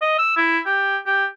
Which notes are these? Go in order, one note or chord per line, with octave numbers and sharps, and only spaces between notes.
D#5
E6
E4
G4
G4